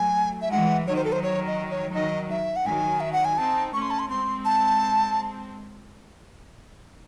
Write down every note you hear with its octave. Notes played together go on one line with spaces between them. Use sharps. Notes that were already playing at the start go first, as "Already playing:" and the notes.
Already playing: F#3 A3 G#5
E5
E3 G#3 F#5
D#3 F#3 C#5
C5
A4
C5
C#5
D#5
C#5
D#3 F#3 D#5
E5
F#5
D#3 F#3 G#5
E5
F#5
G#5
C4 D#4 A5
A3 C#4 C#6
C6
A5
C6
G#3 C4 C6
A5